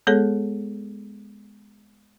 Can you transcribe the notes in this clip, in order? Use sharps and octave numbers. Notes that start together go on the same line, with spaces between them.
G#3 B3 G#4 A4 C#5